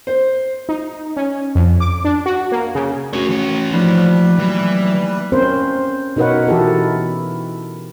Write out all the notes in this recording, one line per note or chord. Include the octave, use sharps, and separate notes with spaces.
C5
D#4
C#4
F2
D6
D4
F#4
A#3
C#3
A3 C#4 F#4 A#4 C#5
E3 C#5
F3 G3 A3 A#3 D#4 B4
E3 F#3
C4 C#4 A#4 C5
B2 D#4 A#4 B4 C#5 F#5
E3 E4 F#4 G4 A4 A#4